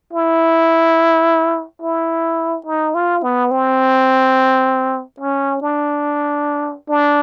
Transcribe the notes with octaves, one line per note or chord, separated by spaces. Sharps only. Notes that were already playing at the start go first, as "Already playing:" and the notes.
E4
E4
D#4
F4
B3
C4
C#4
D4
D4